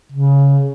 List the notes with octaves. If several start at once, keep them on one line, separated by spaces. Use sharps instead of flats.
C#3